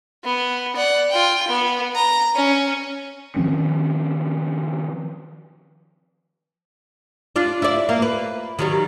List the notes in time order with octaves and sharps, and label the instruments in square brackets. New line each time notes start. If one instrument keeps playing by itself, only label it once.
[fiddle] B3
D5 F#5
F4 G5
B3
A#5
C#4
[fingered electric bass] D#3 F3 C4 C#4
[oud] D4 F4
E4 D5
A#3
B4
D#3 F#3 G3